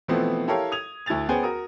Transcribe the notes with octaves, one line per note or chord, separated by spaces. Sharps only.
B2 E3 F3 A3 B3 C4
E4 G4 A4 A#4 C#5 F5
D#6 G#6 F7
D2 E4 A4 G#6 A6 F7
B3 C#4 G#4 C5 G5 G#5
F#4 A#4 D#6